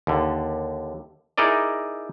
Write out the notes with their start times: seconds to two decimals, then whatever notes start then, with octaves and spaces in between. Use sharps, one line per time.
0.07 D#2 D3
1.38 D#4 E4 G#4 A#4 D5 D#5